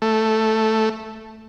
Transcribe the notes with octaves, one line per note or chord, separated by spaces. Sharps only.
A3